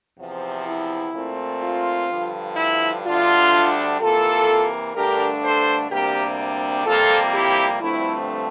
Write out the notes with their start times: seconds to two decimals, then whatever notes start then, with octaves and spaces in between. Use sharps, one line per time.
0.18 E2 C3 F3
0.67 E4
1.13 A#2 A3 C4
1.62 F4
2.10 G2 D3 F3
2.56 E4
3.05 D2 D3 G3 D4 F4
4.00 C3 E3 A#3 F4 A4
4.95 G2 D3 A3 D4 G4 A#4
5.43 A4 C5
5.90 D2 C3 G3 A#3 D4 G4 A#4
6.86 F2 C3 G3 A#3 F4 A4
7.34 E4 G4
7.81 G2 D3 F3 A3 C4 E4